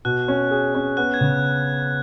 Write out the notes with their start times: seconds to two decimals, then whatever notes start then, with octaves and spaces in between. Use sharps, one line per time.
0.05 B2 F#6
0.28 C#4
0.51 G#4
0.75 C#4
0.97 B3 F#6
1.14 G#6
1.21 C#3